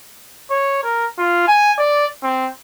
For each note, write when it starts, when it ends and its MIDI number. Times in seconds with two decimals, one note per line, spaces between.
0.50 0.80 73
0.84 1.06 70
1.18 1.46 65
1.48 1.73 80
1.78 2.06 74
2.23 2.49 60